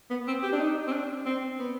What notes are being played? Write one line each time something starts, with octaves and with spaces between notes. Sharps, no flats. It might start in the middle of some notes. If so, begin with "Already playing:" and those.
B3
C4
G4
D4
D#4
C4
D4
C4
B3